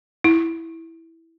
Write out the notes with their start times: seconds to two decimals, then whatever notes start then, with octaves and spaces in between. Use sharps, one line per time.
0.24 E4